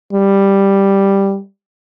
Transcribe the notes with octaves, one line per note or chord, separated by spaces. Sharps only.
G3